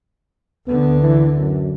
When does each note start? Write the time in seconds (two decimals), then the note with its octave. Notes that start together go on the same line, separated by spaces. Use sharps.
0.67 D2 D3 B3
1.02 E3
1.37 F#2